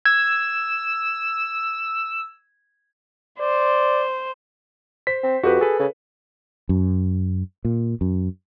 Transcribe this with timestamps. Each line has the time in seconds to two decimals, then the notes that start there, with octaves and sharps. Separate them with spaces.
0.06 E6 G#6
3.40 C5 D5
5.07 C5 B6
5.23 C4
5.43 F2 F#4 G4 B4
5.61 G#4 A4 B4
5.79 C#3
6.69 F#2
7.65 A#2
8.01 F#2